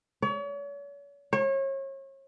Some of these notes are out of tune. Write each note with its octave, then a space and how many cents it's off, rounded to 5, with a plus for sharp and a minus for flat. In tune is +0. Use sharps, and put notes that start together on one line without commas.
C#5 +40
C#5 -35